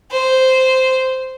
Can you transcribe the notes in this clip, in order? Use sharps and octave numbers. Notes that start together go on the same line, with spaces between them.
C5